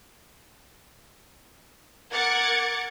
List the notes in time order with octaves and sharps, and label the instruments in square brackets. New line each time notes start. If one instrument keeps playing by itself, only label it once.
[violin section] A#4 F#5 D6 G#6 A6 C#7